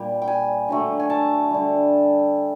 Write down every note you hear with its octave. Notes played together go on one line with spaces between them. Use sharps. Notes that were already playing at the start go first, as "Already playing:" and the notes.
Already playing: A#2 G3
G5
G#5
D3 F#3 A3
G#5
A5
D3 G3